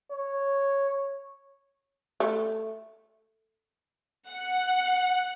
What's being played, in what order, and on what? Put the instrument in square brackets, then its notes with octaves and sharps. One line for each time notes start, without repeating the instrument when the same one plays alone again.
[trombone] C#5
[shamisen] A3
[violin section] F#5